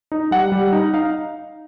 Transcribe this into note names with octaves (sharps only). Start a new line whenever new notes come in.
D#4
G3 F#5
G3
D#4
D#4 F5